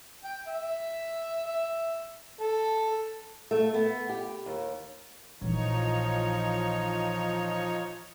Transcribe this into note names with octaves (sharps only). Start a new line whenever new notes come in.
G5
E5
E5
A4
A3
B3
G4
D#2
A#1 E3 F3 D#4 C#5